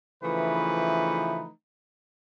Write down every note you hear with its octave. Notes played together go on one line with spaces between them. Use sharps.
C#3 E3 F3 A3 D#4 B4